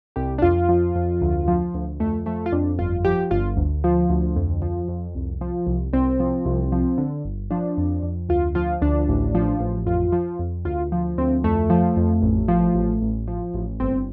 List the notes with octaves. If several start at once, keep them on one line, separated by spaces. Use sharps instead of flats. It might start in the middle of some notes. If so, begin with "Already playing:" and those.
C2 G4
D4
F2 F4
F3
F2
D2
F3
D2
F2 A3
F3 A3
F4
F2 D4
G1 F4
F3 G4
G1 F4
D2
F3
D2
F2
F3
F2
C2
F3
C2
C2 C4
F3
C2
F3
D3
G1
F3 D4
F2
F2
D2 F4
F3 F4
D2 D4
A1
F3
A1
F2 F4
F3
F2
D2 F4
F3
D2 C4
F2 A3
F3
F2
A1
F3
A1
A1
F3
A1
G1 C4